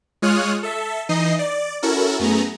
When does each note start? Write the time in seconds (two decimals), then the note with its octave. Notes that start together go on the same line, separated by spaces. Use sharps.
0.22 G#3 F4 C#5 D#6 F6 F#6
0.63 A4 E5
1.09 E3 D#4 D#5 C7
1.39 D5
1.82 C#4 E4 F#4 A4 A#4
2.19 F#2 A3 B3 G#4 A#5